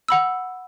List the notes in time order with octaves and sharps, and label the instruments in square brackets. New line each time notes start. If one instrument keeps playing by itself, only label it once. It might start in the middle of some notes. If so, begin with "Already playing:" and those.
[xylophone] F#5 B5 E6